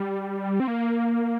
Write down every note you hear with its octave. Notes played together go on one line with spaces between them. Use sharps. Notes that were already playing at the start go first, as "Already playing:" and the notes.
Already playing: G3
C4
A#3